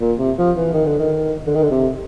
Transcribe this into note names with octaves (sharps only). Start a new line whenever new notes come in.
A#2
C3
F3
E3
D#3
D3
D#3
D3
D#3
D3
C3